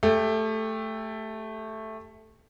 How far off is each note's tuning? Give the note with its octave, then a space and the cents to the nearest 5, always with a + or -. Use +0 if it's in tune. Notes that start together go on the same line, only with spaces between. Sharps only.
A3 +0 G4 +25